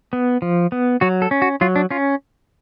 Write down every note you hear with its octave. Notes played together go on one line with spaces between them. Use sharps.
B3
F3
B3
F#3 F#4
A4
C#4
F#4
F#3 F4
D4
C#4 F4